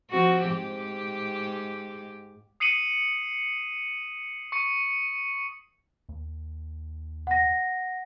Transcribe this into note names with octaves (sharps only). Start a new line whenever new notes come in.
F3 C4 F#4
G#2 G4
D#6 C7 C#7 D#7 F#7
C#6 C#7
D#2
F#5 A#6